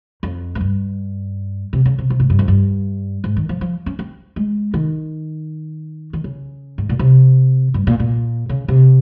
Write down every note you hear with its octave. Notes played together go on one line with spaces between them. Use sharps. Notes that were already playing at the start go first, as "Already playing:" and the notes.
F2
G#2
G2
C3
C#3
C3
C3
G#2
G2
F2
G2
G#2
D#3
F3
F3
C#4
C4
G#3
D#3
D#3
C#3
G#2
A#2
C3
G2
A#2
A#2
C#3
C3